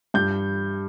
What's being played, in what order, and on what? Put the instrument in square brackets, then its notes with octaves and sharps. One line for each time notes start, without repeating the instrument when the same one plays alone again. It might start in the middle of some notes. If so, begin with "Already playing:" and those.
[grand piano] G2 G6